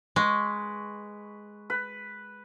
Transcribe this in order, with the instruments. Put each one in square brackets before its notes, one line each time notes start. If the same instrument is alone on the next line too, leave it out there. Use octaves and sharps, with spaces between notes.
[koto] G#3 [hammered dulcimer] B4 C#6
[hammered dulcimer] B4